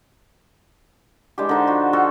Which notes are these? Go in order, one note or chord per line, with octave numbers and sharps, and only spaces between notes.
E3 G#3 D4 G4
D3 D#4 C5
F3 F#4
F4 F#4 A4